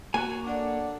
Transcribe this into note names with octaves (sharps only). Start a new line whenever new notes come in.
A#3 F#4 C#5 G#5 F#6
D4 A4 D5 F#5 D6